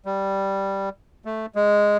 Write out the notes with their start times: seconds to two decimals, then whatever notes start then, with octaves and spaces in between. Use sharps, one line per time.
0.05 G3
1.25 A3
1.55 G#3